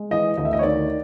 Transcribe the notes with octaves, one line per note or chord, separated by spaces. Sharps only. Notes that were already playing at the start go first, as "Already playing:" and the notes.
Already playing: G#3
E3 D#5
D2 D#5
E5
D#5
C#5
D#3 D5